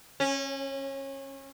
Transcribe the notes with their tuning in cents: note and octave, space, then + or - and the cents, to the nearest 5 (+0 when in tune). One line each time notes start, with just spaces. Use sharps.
C#4 -25